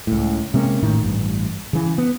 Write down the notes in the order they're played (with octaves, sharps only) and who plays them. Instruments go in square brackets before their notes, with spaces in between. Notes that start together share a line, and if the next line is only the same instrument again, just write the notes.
[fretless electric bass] C#2 A2
C3 G#3 A#3 C#4
A1 A2 D#3
A1 G2
C#3 E3
B3